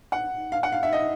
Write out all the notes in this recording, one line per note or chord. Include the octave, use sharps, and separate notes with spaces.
F#5
F5
F#5
F5
E5
D#5